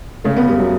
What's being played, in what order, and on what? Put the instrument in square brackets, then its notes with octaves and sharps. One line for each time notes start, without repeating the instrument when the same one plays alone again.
[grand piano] C#3 [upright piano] A3
[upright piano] B3
[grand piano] F#1 [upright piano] G3
[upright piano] F#3